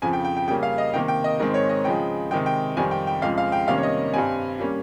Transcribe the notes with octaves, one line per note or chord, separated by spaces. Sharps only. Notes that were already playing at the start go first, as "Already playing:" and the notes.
F2 C#3 F3 G#5
G5
G5
G5
C#3 G3 A#3 C#4 G5
F5
D#5
C3 D#3 A#3 G5
G5
D#5
G#2 D#3 G#3 C4
C#5
D#5
C#3 F3 G#3 G5
C3 D#3 G#3 G5
G5
F2 D#3 G3 C4 G#5
G5
G5
F2 C#3 F3 G#3 F5
F5
G5
C3 D#3 G3 A#3 C#4 F5
C#5
D#5
G2 G3 C4 G#5
G3 A#3 C#4